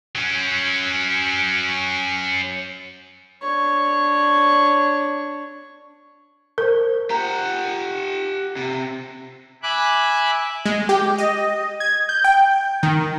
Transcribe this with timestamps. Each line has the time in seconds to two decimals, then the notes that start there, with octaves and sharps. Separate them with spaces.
0.15 F#3 C#4
3.42 D4 C#5
6.58 A#4 C5
7.10 G4 F#5 A#5
8.56 C3
9.63 E5 G#5 B5 D6 F#6
10.66 G#3
10.89 G4
11.18 D#5
11.80 G#6
12.09 G6
12.24 G5
12.83 D#3